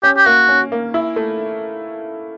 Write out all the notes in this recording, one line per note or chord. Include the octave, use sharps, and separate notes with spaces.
C#4 G4
G4
A#3 F#4
C#4
A#3
E4
A3